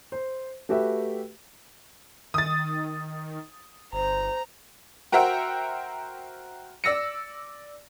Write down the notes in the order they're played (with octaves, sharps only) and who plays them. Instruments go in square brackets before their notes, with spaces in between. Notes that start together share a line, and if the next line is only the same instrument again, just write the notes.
[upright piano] C5
A3 F#4 G4 B4 E5
[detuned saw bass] D#3 [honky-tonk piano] D#6 A6
[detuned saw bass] G1 [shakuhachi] C5 [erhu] A#5
[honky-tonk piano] F#4 A#4 C5 E5 F#5 G5
D5 E6 A#6 C#7